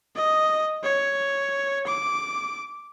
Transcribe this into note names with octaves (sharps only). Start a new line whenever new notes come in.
D#5
C#5
D6